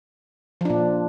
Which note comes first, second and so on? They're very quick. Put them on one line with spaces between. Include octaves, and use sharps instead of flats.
F3 D4 A#2